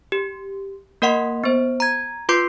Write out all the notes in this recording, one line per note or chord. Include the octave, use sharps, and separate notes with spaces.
G4
A#3 A#4 D#5 F#5 C6
B3 C5
A#5 G#6
F4 B4 C6 D6 G6 C7